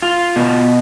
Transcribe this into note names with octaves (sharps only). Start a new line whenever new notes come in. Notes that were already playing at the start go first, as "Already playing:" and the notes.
F4
B2